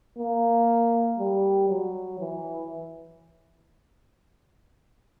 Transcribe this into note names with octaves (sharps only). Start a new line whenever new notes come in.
A#3
G3
F#3
E3